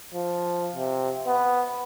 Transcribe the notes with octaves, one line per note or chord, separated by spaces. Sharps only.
F3
C3
B3